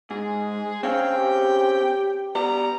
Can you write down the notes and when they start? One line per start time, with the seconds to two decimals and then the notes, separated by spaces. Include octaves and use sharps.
0.11 G#2 G#3 G#4
0.83 C4 C#4 G#4 F5 G5
1.17 G4
2.35 B3 G4 D5 A#5